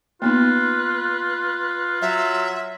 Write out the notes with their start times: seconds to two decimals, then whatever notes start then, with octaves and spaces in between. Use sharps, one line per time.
0.22 A#3 B3 D#4 F4 B4
2.02 F#3 E5